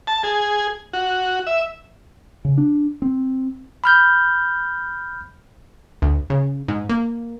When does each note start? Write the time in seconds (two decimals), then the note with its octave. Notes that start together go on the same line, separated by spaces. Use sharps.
0.07 A5
0.23 G#4
0.93 F#4
1.47 E5
2.45 C#3
2.58 D4
3.02 C4
3.84 B5 F6 G6
6.02 D2
6.30 C#3
6.68 G#2
6.89 A#3